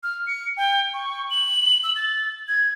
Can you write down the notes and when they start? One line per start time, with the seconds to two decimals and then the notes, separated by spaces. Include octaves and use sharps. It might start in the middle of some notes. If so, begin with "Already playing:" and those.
0.03 F6
0.27 C#7
0.57 G5
0.94 C#6
1.30 F#7
1.84 E6
1.96 A6
2.48 G#6